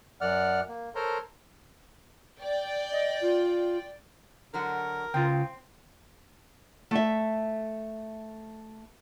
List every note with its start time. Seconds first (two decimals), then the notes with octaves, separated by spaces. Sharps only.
0.21 F#2 D5 F#5 F6
0.68 A#3
0.95 A4 A#4 C5 C#5 A#5 C6
2.39 D5 G5
2.92 D#5
3.21 F4
4.54 D3 F#3 F#4 A#4
5.14 C#2 C#3 C4 F4 G5
6.91 A3 E5